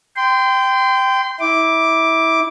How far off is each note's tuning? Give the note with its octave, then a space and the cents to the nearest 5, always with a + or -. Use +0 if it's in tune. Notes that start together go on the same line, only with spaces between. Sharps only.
G5 +0 C6 -30
E4 -25 D6 +0